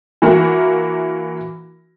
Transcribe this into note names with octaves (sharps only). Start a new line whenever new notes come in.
E3 A#3 E4 F#4 A#4